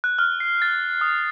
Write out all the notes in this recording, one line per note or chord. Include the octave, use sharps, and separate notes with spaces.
F#6
F6
C7
A6
D#6